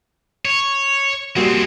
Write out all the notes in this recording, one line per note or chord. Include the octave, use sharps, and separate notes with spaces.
C#5
G3 G#3 A#3 C4 F#4